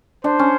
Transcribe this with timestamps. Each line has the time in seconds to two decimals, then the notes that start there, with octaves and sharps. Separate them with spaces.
0.24 D4 C5
0.39 C#4